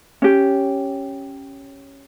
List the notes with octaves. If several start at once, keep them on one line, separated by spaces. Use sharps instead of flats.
C#4 G4